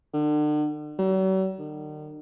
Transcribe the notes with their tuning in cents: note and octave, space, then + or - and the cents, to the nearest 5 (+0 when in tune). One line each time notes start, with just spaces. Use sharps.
D3 +40
F#3 +45
D#3 -45